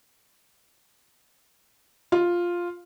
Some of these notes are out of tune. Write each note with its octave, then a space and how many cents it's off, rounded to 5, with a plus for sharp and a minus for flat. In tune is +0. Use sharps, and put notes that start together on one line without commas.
F4 +0